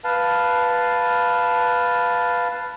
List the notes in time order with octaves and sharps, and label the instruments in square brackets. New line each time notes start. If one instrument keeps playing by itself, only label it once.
[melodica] B4 F5 A5